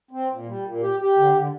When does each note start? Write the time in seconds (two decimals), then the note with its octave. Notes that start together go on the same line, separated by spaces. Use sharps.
0.11 C4
0.29 A#2
0.47 G3
0.64 A#2
0.82 G4
1.00 G4
1.17 D3
1.35 D3